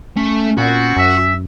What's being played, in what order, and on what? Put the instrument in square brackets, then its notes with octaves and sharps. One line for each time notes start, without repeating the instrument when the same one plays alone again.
[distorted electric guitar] A3 [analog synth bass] C#4
[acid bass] A#2 [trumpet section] B3 C4 [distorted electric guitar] F#4
[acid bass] F#2 [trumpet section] E5